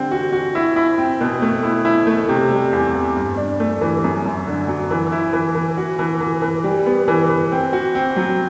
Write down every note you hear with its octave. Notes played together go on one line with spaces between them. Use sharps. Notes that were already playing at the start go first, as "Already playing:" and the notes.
Already playing: D3 G3 C4
F#4
F#4
E4
E4
C4
B2
A3
E4
E4
A3
C3
G3
E2
E2
G2
D4
A3
E3
F#2
F#2
D3
F#3
E3
E4
E3
E3
F#4
E3
E3
E3
G3
B3
E3
E3
C4
F#4
C4
F#3